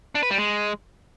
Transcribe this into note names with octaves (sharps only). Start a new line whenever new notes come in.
D4
B4
G3
G#3